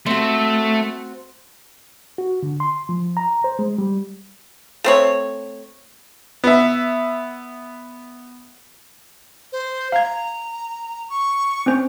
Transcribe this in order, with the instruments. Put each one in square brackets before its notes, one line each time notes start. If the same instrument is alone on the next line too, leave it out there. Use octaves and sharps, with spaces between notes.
[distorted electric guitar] A3 [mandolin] C4 F#4
[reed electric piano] F#4
D3
C6
F3
A#5
C5
G#3
G3
[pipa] A3 C4 C#5
[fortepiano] B3 E5
[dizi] C5
[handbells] F5 G#6 [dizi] A#5
[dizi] C#6
[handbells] C4 C#4 C5